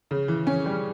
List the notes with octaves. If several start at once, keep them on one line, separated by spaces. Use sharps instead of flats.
C#3
E3
C#4
G3